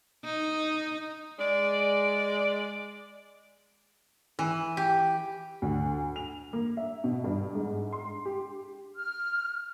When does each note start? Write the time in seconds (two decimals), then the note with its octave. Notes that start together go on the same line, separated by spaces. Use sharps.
0.24 D#4
1.39 G#3 D5
4.39 E3
4.77 G4
5.62 D2
6.16 F7
6.53 A#3
6.77 E5
7.04 B2
7.24 G2
7.55 G#2
7.93 C6
8.25 G4
8.96 F6